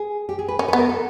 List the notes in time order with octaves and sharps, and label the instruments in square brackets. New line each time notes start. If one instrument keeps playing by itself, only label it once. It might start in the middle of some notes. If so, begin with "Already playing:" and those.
Already playing: [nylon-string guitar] G#4
G4
G#4
B4
[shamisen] C#4 [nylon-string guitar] A#4
[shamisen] B3 [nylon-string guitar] B4
[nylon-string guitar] A#4
A4